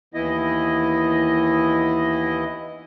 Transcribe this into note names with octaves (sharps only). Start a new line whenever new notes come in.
D#2 E3 B3 E4 D#5